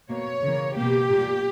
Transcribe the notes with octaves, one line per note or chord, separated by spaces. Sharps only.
B2 A#3 C#5
C#3 E3 A#3
B2 A#3 G4
A#2 A#3